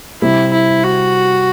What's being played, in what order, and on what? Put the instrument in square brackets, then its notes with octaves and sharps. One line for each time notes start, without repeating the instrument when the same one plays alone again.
[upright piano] C3 G3 C4 [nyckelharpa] E4
[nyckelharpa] E4
F#4